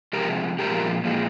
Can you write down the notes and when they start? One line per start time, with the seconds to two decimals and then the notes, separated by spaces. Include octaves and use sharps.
0.13 C3 F3 G#3 G4 A#4
0.59 A#2 F3 G#3 G4 A#4
1.04 A#2 F3 G#3